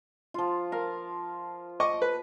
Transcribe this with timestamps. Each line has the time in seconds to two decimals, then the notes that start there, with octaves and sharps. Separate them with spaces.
0.34 F3 F4
0.72 A#4 F5
1.80 D#5 C#6 D6
2.02 B4